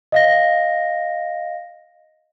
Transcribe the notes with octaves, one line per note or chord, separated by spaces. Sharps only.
D#5 F5 A#6